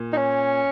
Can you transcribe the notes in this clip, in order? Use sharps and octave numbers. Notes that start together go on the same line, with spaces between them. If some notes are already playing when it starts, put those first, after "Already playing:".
Already playing: A#2
D#4
C#4